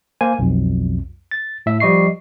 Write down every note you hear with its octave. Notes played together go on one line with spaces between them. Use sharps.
A#3 C5 G#5
B1 F2
A6
A2 E5
F3 G3 D#5 C#6 C7